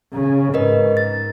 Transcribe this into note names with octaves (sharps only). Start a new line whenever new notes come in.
C#3
G#2 A#4 B4 D#5
A6